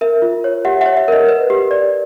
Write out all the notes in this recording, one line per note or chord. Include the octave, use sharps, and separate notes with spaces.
A#4 E5
F4
C#5
G4 E5 F#5
C#5 E5 F#5
E5
A#4 D#5
B4
G4
D5